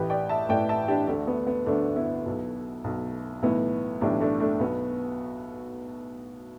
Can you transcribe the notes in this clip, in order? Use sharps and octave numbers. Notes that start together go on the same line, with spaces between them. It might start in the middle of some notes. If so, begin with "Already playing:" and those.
Already playing: A1 A2 E3 G4 B4
D5 G5
E5 A5
A1 A2 E3 D5 G5
E5 A5
D4 G4
D2 D3 A3 D4
B3
B3
D2 D3 A3 D4
B3 E4
B1 B2
B1 B2
B1 A2 E3 B3 E4
B1 A2 E3 D4 G4
A3 D4
A3 D4
B1 B2 B3